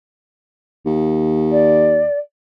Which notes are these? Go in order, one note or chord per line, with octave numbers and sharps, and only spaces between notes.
D#2
D5